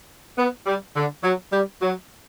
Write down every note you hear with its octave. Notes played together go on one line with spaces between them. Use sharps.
B3
G3
D3
F#3
G3
F#3